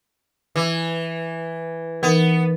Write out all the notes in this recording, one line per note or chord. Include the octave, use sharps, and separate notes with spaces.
E3
E3 B3 D#4 A#4